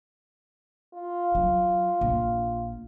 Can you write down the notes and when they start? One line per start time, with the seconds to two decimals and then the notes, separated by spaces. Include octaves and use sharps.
0.94 F4
1.35 F#3
2.01 A#1